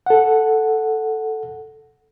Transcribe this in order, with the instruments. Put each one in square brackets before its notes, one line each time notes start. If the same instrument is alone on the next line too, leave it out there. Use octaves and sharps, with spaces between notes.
[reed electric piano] A4 F#5